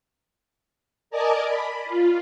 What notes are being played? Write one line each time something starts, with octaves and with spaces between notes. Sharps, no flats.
A#4 D5 D#5 G#5 A5 D6
B5
F4